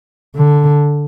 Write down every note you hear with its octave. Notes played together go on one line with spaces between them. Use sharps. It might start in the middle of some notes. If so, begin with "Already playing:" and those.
D3